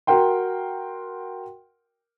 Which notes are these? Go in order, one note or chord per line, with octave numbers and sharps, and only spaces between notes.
F#4 A#4 F#5 G5 C6